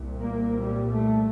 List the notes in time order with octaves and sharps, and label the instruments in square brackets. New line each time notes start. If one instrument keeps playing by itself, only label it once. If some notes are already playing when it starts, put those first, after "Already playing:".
Already playing: [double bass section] C2 A#2
A#3
G3
A3